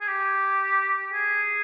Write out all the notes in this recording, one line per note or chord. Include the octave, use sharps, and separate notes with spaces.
G#4
G4
G#4